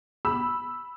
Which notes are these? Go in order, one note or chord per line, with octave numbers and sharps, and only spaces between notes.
B5 E6